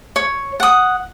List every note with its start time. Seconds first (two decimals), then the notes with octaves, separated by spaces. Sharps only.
0.16 C#5
0.60 F#5 D#6